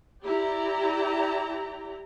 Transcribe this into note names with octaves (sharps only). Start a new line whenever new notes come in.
E4 G4 D5 G5 A#5